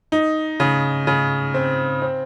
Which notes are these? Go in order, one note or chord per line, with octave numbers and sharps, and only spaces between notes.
D#4
C#3
C#3
C4
C4